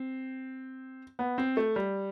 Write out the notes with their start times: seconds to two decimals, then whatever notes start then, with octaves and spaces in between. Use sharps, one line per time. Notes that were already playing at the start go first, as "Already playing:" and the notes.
Already playing: C4
1.19 B3
1.38 C4
1.57 A3
1.76 G3